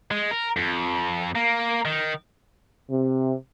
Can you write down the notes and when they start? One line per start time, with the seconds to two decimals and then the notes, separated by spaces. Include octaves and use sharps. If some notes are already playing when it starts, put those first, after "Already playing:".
0.11 G#3
0.31 A#4
0.57 F2
1.36 A#3
1.85 D#3
2.89 C3